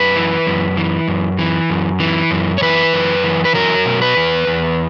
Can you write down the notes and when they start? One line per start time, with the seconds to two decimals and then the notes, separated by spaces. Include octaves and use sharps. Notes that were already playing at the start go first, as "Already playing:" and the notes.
Already playing: F#2 B4
0.16 E3
0.47 F#2
0.77 E3
1.08 F#2
1.39 E3
1.70 F#2
2.00 E3
2.31 F#2
2.58 C#5
2.62 E3 B4
2.94 F#2
3.24 E3
3.45 B4
3.54 F#3 A#4
3.85 B2
4.02 B4
4.17 E2
4.47 E2